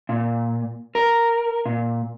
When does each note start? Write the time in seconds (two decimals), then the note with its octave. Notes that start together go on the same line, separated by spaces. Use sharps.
0.09 A#2
0.95 A#4
1.66 A#2